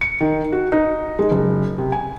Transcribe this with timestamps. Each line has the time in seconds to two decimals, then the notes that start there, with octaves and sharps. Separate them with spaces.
0.01 C#7
0.21 D#3
0.52 F#4
0.72 D#4
1.19 G#3
1.31 F#1
1.78 C3
1.92 G#5